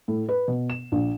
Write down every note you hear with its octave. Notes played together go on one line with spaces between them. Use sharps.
A2
B4
B2
E7
A#1